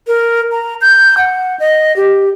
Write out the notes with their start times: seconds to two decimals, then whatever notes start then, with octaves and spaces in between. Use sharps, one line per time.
0.07 A#4
0.52 A#5
0.81 G6
1.18 F#5
1.60 D#5
1.96 G4